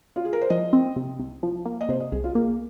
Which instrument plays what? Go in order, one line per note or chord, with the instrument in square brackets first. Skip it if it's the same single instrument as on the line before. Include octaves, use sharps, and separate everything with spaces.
[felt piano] F4
G#4
A#4
C5
[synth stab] F3 [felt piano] D#5
[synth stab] C4
C3
C2
F3
A#3
[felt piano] D#5
[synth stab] C3 [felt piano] C5
[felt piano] D#5
[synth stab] C2 [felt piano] G#4
[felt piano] F4
[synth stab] A#3 [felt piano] G#4